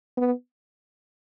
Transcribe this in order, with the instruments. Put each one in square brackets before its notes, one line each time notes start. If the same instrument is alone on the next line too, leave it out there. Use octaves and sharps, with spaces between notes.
[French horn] B3